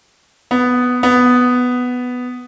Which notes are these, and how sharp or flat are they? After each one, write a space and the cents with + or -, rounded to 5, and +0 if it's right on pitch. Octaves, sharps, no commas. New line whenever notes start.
B3 +5
B3 +5